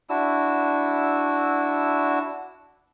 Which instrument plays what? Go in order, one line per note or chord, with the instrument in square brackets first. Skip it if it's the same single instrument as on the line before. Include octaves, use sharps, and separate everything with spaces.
[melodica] D4 E4 F#4 E6